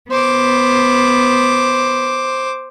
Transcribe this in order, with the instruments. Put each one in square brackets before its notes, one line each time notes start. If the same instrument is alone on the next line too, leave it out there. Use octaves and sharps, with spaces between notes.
[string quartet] B3 [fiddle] C5 D6